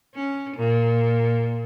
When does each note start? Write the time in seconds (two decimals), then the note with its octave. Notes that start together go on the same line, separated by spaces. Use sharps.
0.15 C#4
0.57 A#2